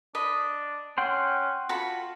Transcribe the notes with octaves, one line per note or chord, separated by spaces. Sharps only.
D4 D#5 B5
C#4 F#5 G5 C6
F4 F#4 A4 B5